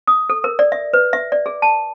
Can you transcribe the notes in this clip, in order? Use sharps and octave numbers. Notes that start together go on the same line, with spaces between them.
D#6
A4
A#4
D5
E5
B4
E5
D5
G#4
A5